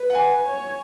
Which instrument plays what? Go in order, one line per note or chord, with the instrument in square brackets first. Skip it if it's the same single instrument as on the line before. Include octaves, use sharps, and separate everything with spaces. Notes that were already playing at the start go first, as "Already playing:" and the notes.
Already playing: [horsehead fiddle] B4
[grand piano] F#5
G#5
[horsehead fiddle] C#5